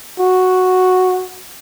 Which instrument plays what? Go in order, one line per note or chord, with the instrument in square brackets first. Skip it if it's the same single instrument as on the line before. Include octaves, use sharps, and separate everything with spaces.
[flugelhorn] F#4